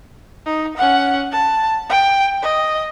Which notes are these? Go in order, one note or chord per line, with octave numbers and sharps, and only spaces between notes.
D#4
C#4 F#5
A5
G5
D#5